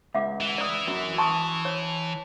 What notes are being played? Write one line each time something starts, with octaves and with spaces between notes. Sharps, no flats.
C#2 E5 F#5 D6
E3
D5 D#6
F#2
A5 C6 C#6 D#6
C#5